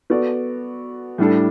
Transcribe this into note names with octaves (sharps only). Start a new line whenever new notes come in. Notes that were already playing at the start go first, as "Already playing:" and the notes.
B3 F#4 A4 D5
A2 G3 D4 A4